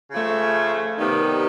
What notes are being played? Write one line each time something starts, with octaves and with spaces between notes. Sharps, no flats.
C#3 F3 A3
C3 D#3 G3 B3 D#4